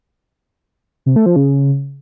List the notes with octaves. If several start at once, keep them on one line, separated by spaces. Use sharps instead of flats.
C3
A3
F3
C#3